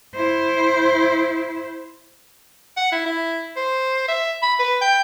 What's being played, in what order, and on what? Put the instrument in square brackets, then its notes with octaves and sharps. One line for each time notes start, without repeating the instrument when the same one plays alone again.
[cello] E4 C5
[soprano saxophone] F#5
E4
E4
C5
E5
B5
B4
G5